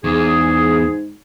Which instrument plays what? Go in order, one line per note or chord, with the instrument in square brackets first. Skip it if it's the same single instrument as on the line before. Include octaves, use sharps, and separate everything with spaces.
[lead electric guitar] E2 [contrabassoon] G#2 [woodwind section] G#4